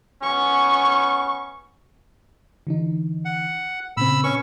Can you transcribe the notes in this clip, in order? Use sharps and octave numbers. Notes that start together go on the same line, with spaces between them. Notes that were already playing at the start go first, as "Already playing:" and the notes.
B3 C#4 C#6
D3 E3 D#4
F#5
A#2 C#3 C4 B5 E6
C#4 B4 C#6